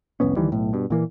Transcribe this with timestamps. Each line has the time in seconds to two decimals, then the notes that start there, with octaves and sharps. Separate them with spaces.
0.20 F1 C2 B3 C#4
0.36 D2 D#3 E3 G3
0.52 B1 A2
0.73 G2 B2
0.90 A#2 E3 A#3